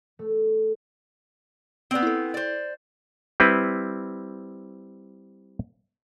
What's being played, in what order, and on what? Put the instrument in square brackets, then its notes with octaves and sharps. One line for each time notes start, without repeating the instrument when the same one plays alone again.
[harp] A3
[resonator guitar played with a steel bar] B3 C4 [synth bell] D5 D7
[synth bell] E4 A4
[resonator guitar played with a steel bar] C5 D5
[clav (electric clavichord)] G3 C4 E4 B4